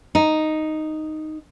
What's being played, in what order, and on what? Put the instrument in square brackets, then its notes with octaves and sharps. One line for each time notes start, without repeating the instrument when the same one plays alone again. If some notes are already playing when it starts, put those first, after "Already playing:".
[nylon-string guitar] D#4